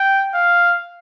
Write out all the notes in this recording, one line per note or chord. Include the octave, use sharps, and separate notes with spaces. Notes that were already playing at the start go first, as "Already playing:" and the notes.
Already playing: G5
F5